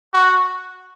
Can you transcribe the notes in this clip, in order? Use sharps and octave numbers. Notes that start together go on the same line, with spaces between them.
F#4